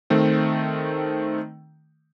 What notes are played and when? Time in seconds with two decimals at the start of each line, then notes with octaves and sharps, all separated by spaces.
0.10 D#3 A3 C4